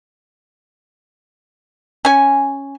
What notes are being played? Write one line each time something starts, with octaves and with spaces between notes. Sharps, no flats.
C#4 G#5